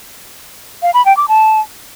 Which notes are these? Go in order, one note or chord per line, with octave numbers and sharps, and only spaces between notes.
F5
B5
G5
D6
A5